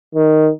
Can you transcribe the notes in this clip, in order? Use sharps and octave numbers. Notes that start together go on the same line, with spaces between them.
D#3